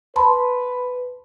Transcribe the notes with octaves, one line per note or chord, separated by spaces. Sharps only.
B4 A5 B5 C6